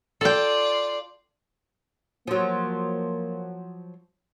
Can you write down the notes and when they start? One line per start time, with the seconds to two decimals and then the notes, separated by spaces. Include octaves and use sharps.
0.21 F4 A4 D5 G5
2.27 F3 F#3 A#3